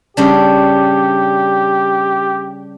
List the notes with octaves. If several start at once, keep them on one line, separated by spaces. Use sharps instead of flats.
C#3 G3 D4 G4